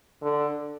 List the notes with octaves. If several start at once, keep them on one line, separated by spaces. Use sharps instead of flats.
D3